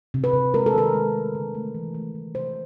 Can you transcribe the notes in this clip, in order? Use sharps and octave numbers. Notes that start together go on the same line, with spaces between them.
C3
B4
C3
G#3 A#4
A4
D#3 A#4
G#3
A3
D3
A3
E3
A3
E3
C3 C5